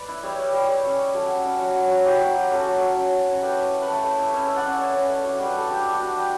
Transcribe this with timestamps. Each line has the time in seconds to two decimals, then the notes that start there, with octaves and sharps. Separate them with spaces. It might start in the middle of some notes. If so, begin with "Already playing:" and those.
Already playing: B4 D5
0.08 E4
0.23 G3 C#5 E5
0.38 G3
0.53 G3
0.68 G3 C#5 E5
0.84 C#4 C#5 E5
0.99 E4
1.14 G3 F#4 A4
1.29 C#4
1.45 C#4
1.59 F#3 F#4
1.75 F#3
1.91 F#3
2.05 E4 G4
2.21 F#3
2.36 F#3
2.51 C#4 F#4 A4
2.66 F#3
2.82 F#3
2.97 C#4
3.12 F#3
3.27 C#4 C#5
3.42 A3 G4 B4
3.58 E4
3.73 E4
3.82 B4
3.87 A3 A4 C#5
4.03 A3
4.18 E4
4.33 C#4 C#5 E5
4.47 E4 E5
4.56 D5 F#5
4.64 C#4
4.79 A3 C#5 E5
4.94 C#4
5.09 A3
5.25 D4 F#4
5.39 G3
5.45 B4
5.54 G3 A4
5.70 D4 G4
5.85 D4
5.93 F#4
6.00 D4
6.16 G3 G4